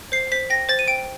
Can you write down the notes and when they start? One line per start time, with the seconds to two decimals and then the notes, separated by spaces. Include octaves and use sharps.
0.12 C5 C7
0.32 C5 B6
0.50 G5 A#6
0.69 C5 A6
0.79 D#7
0.88 G5 D7